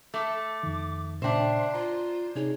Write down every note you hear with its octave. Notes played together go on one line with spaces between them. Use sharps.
A3 D6
F2 D#3
A#2 C#3 D4 C5 E5 G5
F4 A#5
C3 D#4 G#4 C#5